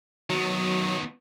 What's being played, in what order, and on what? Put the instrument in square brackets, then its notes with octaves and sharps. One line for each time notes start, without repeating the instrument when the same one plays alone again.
[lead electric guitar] D#3 B3 [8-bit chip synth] F#3